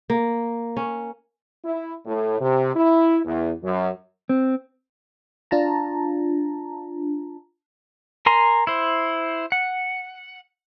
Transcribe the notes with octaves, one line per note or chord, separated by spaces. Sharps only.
A#3
C#4
E4
A2
C3
E4
E2
F#2
C4
D4 F4 A5 A#5
A#4 G#5 A#5 C6
E4 C5
F#5